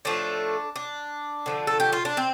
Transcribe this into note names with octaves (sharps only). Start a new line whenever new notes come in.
A2 F3 A3 D4
D4
D3 F3 A3
A4
G4
F4
D4
C4